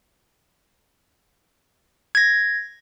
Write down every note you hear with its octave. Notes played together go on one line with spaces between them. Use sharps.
G#6 A#6